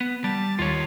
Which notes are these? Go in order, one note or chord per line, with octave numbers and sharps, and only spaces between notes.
B3
G3 A5
D#2 F4 C#5